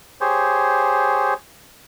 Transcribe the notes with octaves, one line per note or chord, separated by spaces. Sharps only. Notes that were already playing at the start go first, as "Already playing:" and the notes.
G4 G#4 C5 C#5